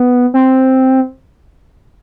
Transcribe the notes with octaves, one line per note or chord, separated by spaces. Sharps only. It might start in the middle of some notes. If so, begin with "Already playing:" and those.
Already playing: B3
C4